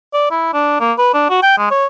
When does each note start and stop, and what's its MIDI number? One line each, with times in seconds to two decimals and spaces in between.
0.14 0.26 74
0.31 0.50 64
0.53 0.79 62
0.80 0.93 58
0.98 1.10 71
1.14 1.26 62
1.30 1.38 66
1.43 1.56 79
1.57 1.68 56
1.71 1.86 73